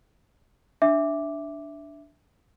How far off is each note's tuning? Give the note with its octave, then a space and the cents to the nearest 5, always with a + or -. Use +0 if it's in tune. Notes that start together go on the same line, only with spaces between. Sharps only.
D4 +0 E5 +0 D6 +0